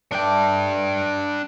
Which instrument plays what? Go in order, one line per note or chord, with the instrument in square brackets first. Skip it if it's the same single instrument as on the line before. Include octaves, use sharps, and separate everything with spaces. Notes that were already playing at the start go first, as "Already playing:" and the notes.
[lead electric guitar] D4 G5 [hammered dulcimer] A4 D5 E5